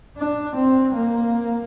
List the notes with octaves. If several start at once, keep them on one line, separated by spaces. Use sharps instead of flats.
D4
C4
A#3